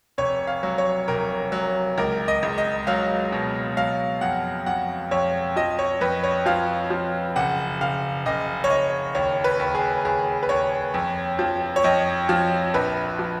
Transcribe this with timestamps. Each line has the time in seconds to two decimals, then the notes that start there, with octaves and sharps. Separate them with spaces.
0.18 F1 C#5
0.47 F5
0.63 F#3
0.78 C#5
1.08 F1 A#4
1.52 F#3
1.98 C#2 A#4
2.28 D#5
2.43 C#2
2.58 D#5
2.87 F#3 F5
3.32 B2
3.77 F#3 F5
4.21 F2 F#5
4.66 F2 F#5
5.11 F2 C#5
5.56 F3 D#5
5.79 C#5
6.01 F2 B4
6.24 C#5
6.46 F3 F5
6.90 F3
7.36 F#1 F#5
7.80 F#1 F5
8.26 F#1 D#5
8.64 C#5
8.70 F#1 D#5
9.15 D#2 C#5
9.44 B4
9.60 D#2
9.75 G#4
10.05 D#2 G#4
10.43 B4
10.49 D#2 C#5
10.94 F2
11.39 F3
11.76 C#5
11.84 F2 D#5
12.29 F3
12.74 A#1 B4
13.19 F3